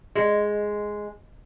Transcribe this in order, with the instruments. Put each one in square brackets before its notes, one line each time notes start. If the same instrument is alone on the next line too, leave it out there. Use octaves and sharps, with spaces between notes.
[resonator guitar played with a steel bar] G#3